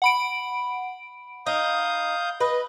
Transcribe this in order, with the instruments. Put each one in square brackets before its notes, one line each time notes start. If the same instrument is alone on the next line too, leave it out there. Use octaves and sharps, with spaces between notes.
[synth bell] F#5 B5 D7
[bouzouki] D#4 [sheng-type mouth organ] F5 D#6 G6
[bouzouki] B4 [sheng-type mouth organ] D#5